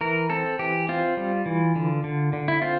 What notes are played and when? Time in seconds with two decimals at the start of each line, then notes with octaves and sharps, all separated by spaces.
0.01 E3 A#4
0.30 C4 A4
0.59 E3 G4
0.89 C4 F4
1.17 G3
1.46 E3
1.76 D3
2.04 D3
2.33 D3
2.48 E4
2.62 C4 F4